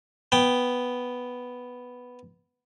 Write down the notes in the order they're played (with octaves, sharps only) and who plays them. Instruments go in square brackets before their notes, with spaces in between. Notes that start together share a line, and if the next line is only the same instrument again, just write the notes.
[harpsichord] B3 G5